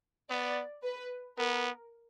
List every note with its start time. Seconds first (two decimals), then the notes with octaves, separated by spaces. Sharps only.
0.30 B3 D5
0.83 B4
1.37 B3 A#4